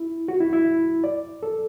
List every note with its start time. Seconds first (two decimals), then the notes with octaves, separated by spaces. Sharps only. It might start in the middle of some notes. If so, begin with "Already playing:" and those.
Already playing: E4
0.28 F#4
0.40 E4
0.53 E4
1.04 D5
1.43 A4